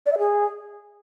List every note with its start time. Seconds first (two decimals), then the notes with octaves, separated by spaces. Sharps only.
0.06 D5
0.12 E5
0.19 G#4